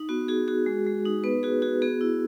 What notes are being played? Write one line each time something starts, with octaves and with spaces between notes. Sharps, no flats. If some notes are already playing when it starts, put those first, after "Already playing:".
Already playing: D#4
B3 F#4
F#4 G#4
F#4 G#4
G#3
G#3
D#4
B3 B4
F#4 G#4
F#4 G#4
B3 G#4
E4